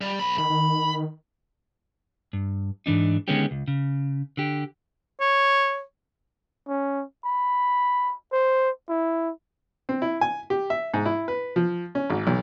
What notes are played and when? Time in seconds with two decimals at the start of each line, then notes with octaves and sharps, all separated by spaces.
0.01 G3
0.20 B1 B5
0.39 D#3 B5
0.50 D#3
2.33 G2
2.86 G#2 E3 D4 D#4
3.28 D3 D#3 G#3 B3 C#4 G4
3.51 C#2
3.68 C#3
4.37 D3 G4
5.21 C#5
6.68 C#4
7.25 B5
8.32 C5
8.89 E4
9.89 C4
10.02 E4
10.21 G#5
10.50 G4
10.70 E5
10.94 G#2
11.06 E4
11.28 B4
11.56 F3
11.95 C#4
12.10 G#1
12.27 B1